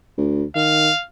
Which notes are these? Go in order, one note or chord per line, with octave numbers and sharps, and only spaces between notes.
D2
D#3 F5